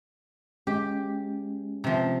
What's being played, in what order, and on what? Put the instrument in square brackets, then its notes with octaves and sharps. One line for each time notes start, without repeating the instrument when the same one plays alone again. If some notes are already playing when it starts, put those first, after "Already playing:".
[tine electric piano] G#3 C#4 [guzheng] G4
[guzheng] C3 F3